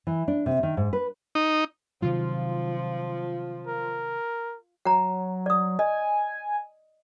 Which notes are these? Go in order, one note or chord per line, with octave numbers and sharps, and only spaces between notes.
E3
D4
C3
D#3
G#2
B4
D#4
C3 D#3 F3 F#3 F4
A#4
F#3 F#5 A#5
D5 D#6
D#5 G#5